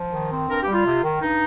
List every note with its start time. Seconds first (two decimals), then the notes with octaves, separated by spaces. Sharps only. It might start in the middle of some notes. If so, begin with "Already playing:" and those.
Already playing: F3
0.12 D#3
0.30 C4
0.48 G2 A#4
0.62 G4
0.67 G3
0.73 F4
0.86 C3
1.03 D#3
1.21 G2 D#4